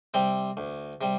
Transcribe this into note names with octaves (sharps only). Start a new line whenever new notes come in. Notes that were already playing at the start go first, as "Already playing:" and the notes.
C3 G3 C4
D2
C3 G3